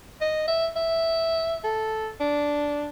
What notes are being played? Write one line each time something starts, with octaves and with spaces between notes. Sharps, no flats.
D#5
E5
E5
A4
D4